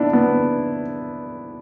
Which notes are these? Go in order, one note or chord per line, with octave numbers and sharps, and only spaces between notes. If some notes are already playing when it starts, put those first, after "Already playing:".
Already playing: B3 D4 E4
B3